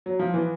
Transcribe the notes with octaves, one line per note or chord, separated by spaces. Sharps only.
F#3
F3
E3